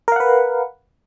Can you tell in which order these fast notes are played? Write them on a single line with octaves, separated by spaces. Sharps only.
A#4 F5 F#5 B4